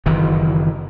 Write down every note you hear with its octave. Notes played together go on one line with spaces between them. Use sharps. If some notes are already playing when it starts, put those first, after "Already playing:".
F#1 D#3 E3